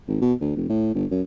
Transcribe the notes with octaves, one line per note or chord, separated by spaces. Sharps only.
G#1
B2
D2
F1
A2
G1
F#2